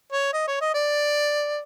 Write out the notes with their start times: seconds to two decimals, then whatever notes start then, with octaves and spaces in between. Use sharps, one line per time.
0.12 C#5
0.33 D#5
0.47 C#5
0.61 D#5
0.74 D5